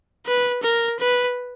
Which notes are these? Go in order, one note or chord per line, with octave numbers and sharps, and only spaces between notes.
B4
A#4
B4